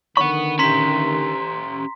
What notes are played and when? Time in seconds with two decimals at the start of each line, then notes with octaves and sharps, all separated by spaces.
0.17 D3 D#3 F#5 B5 C#6
0.59 C#4 G4 A#5 C6 B6